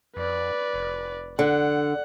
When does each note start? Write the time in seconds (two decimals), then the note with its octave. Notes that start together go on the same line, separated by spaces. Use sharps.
0.16 F2 B4 D5
0.74 F1
1.39 D3 F#5